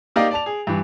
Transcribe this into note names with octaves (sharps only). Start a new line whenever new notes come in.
A#3 D#4 G4 D5 D#5 F5
D5 A5 F7
G#4
G2 E3